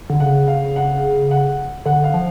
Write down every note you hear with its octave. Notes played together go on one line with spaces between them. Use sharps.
D3
C#3 F#5
F5
F#5
F#5
D3 F#5
F5
F3